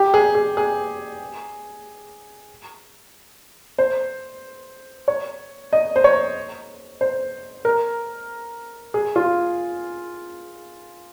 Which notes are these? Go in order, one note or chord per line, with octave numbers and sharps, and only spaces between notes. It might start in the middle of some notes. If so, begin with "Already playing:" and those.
Already playing: G4
G#4
G#4
G#4
C5
C#5
D#5
C5
C#5
C5
A#4
G#4
F4